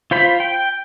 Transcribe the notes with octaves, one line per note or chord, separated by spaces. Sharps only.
F4 C5 B5
G5